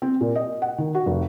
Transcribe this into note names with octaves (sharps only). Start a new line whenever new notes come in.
C4
A#2
D#5
F#5
D#3
F#4
F1